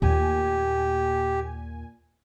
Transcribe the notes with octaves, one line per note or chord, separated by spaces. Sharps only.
D#2 A#2 A3 G4 G#5